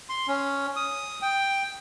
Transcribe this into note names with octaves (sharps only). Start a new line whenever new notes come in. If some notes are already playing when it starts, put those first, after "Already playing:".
C6
C#4
D#6
G5